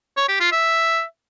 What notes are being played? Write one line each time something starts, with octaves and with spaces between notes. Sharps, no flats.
C#5
G4
F4
E5